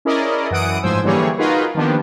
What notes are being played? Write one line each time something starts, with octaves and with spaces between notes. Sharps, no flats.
C#4 E4 G#4 A#4 D5 D#5
F#2 E3 F#5 D#6 D7
A1 G#2 F3 C5 G#5 E6
D3 E3 G3 A#3 G#4 C#5
D#4 F4 F#4 G#4 A#4 B4
D#3 F3 A#3 B3 D4 G4